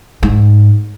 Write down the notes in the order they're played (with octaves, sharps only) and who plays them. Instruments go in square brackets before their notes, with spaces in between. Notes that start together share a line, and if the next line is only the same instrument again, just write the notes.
[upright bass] G#2